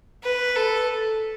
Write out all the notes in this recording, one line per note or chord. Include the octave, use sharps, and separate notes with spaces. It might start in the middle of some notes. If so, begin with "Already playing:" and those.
B4
A4